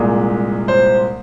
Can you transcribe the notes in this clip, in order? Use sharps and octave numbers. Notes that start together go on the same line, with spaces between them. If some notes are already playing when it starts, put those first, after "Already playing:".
Already playing: C2 A#2 G#3
C5